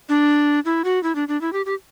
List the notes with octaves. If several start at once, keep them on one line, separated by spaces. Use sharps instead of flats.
D4
E4
F#4
E4
D4
D4
E4
G4
G4